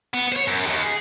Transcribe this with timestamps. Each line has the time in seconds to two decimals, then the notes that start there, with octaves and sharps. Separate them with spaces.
0.14 B3
0.32 C5 C#5
0.47 F#2
0.67 D#2
0.83 G#4